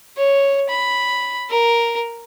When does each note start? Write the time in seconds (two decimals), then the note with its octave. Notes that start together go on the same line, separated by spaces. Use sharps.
0.17 C#5
0.69 B5
1.50 A#4